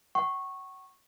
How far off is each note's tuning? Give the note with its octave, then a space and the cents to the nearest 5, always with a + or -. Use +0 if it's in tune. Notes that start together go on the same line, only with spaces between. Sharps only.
F#5 +45 C#6 -15